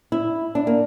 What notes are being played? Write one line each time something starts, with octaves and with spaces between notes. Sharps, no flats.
E4
D4
A#3